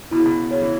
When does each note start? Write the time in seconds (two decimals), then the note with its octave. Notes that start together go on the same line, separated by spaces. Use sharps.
0.11 B2 E4
0.19 C#3
0.26 B2
0.51 C#3 C#5
0.62 E3